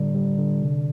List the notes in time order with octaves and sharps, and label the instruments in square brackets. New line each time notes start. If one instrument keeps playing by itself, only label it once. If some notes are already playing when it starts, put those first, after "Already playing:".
Already playing: [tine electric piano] A2 D3 G3 D5
G3
D3
C3